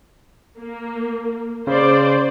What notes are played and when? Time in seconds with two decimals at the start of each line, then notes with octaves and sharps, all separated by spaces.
0.58 A#3
1.67 C#3 C5 D5